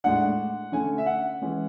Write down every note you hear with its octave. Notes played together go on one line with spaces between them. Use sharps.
A2 G#3 D4 F#5
D3 A3 C#4 G#5
E5
F#5
E3 G#3 C#4